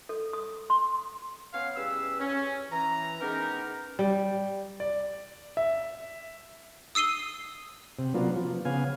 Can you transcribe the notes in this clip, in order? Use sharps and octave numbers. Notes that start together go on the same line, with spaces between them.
A4
D#6
C6
B3 C#4 C#5 F5
E2 G3 C#4 B4 E6
C#4
E3 A#5
G#3 B3 C#4 D#4 G4 A#4
G3
D5
E5
D#6 E6 C7 D#7 G7
C3
F#3 A#3 B3 D4 F4
F3
C#3 B3 F5 G#5